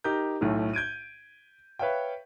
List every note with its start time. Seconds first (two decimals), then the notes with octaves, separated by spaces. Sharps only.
0.04 D#4 G4 A#4 A#5 G6
0.41 B1 A2 A3
0.73 G6 G#6 D7 D#7
1.79 B4 C#5 E5 F5 G5